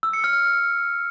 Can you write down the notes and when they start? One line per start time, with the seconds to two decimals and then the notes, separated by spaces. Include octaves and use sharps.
0.03 E6
0.13 C#7
0.24 F6